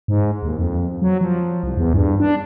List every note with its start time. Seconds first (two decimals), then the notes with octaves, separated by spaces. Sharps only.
0.08 G#2
0.43 D#2
0.58 F2
1.02 F#3
1.21 F3
1.63 C2
1.77 E2
1.94 G2
2.20 D4